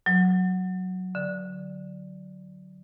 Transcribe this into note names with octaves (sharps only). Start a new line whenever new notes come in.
F#3
D3